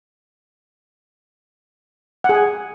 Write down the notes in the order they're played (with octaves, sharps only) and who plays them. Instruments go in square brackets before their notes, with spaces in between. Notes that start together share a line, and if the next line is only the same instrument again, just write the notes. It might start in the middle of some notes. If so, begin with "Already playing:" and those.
[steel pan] F#5
G#4
G#5